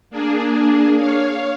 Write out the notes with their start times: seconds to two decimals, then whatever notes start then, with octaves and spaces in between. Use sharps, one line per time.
0.10 A#3 D4 G#4
0.98 C#5 F5